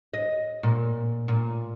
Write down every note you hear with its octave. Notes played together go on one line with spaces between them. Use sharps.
D#5
A#2
A#2